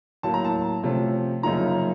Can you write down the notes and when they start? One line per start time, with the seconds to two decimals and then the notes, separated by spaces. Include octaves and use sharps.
0.23 A2 F#3 A#3 A5
0.34 A#5
0.45 A5
0.83 C3 F3 A3 C#4
1.43 F#2 C#3 F3 A#3 D#4 A#5